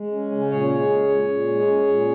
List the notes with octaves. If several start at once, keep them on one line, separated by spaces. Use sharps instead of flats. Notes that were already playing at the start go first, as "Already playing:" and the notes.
Already playing: G#3
C#4
C#3
A#2 G#4 C#5
G#3
C#4
A#2
A#2
G#3
C#4
A#2